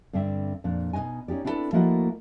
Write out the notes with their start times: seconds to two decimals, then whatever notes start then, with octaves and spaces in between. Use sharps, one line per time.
0.13 G2 D3 C4 E5
0.64 F2 A#2 D4
0.93 B2 D#4 C5 D#5 G#5
1.28 C#4 D#4 G4 D5
1.45 C4 D4 E4 F4 A4 B4
1.73 F3 A3 A#3 E4 F#4 D#5